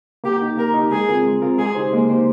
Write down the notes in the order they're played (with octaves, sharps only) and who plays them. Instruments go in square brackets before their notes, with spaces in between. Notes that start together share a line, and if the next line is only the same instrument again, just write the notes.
[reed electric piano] A#3 [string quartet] G4
[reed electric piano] D#4 G4
[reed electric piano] A#3 [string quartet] A#4
[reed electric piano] D#4
G4
[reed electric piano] G#3 [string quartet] G#4
[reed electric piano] C4 F4 A#4
G#3
C4 F4 A#4
[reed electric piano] G#3 [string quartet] G#4
[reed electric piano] D#4 G4 C5
[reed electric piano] G#3 [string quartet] A#3
[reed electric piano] D#4 G4 C5